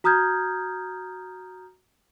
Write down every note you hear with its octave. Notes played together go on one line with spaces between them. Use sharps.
F#4 A#5 D#6 F6 G6 G#6